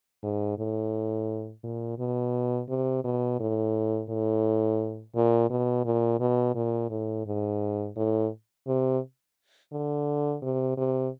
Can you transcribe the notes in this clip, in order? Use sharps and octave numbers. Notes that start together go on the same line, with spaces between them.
G#2
A2
A#2
B2
C3
B2
A2
A2
A#2
B2
A#2
B2
A#2
A2
G#2
A2
C3
D3
C3
C3